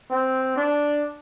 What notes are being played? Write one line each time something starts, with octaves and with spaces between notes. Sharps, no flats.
C4
D4